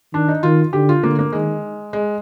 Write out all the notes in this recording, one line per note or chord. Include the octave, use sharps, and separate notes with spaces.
D#3 D4
D#4
D#3 F4
D3 G4
F4
D3 A#3
A#3
D#3 G#3
G#3